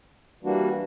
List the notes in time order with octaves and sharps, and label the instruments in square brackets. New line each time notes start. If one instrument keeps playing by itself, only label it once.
[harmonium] E3 G3 A#3 D4 F#4